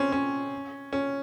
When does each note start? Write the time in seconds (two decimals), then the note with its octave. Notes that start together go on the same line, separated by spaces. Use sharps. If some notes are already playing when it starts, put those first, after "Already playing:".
Already playing: C4 C#4
0.12 C#4
0.93 C#4